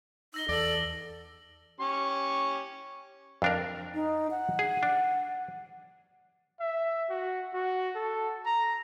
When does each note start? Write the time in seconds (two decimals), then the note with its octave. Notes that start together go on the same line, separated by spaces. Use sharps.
0.34 D#4 E6 A#6 G7
0.49 E2 A4 D5 A#6 F#7
1.80 C#4 G4 C#6
3.42 F2 D4 A#4
3.94 D#4
4.31 F#5
4.59 G#4
4.83 D4
6.60 E5
7.10 F#4
7.54 F#4
7.95 A4
8.46 A#5